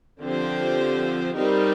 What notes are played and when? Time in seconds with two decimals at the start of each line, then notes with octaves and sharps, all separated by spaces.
0.20 D3 F3 C4 G4 C5
1.34 G3 C4 D#4 G4 A#4